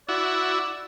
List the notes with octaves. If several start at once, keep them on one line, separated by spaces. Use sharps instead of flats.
E4 F#4 D5